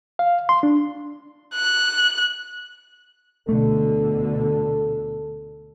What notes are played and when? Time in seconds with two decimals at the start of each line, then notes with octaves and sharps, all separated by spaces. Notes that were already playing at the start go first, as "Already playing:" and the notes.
0.19 F5
0.49 C6
0.63 D4
1.55 F#6
3.49 D2 B2 D3 A3 A4